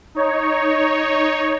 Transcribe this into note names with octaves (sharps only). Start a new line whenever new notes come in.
D#4 C#5